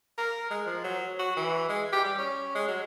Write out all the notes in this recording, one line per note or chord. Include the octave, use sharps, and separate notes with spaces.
A#4
G#3
F3
F#3
F#4
E3
G#3
G4
G3
C#4
G#3
F#3